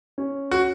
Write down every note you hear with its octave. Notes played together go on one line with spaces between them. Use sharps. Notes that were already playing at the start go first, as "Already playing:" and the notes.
C#4
F#4